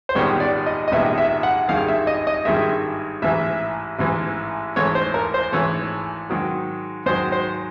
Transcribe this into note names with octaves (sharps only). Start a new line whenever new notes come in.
C5
A#1 G#2 D#3 G3 B3 C#5
D5
D#5
D#5
A#1 G#2 D#3 G3 B3 E5
E5
F#5
G#1 G2 D#3 G#3 F5
E5
D#5
D#5
G#1 G2 D#3 G#3 E5
A1 G#2 E3 E5
A1 G#2 E3
G#1 G#2 E3 A3 C#5
C5
A#4
C5
G#1 G#2 E3 A3 C#5
G#2 D#3 F#3
G#2 D#3 F#3 C5
C5